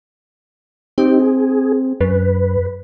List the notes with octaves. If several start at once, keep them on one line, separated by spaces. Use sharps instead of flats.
C4 D#4 G4
G#4
F#2 B4